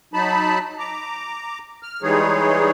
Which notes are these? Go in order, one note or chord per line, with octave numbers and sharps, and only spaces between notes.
F#3 D#4 A5 B5
A#5 D6
F6
E3 G3 G#3 D#4 G#4 C#5